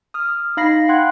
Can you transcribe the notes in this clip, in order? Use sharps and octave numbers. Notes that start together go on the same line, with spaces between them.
D#6 F6
D#4 F5 B5 A#6 C7
F#5 G5 C6 F#6 G#6